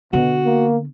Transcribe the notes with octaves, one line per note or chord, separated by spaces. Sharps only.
B2 D3 B3 F#4
A#3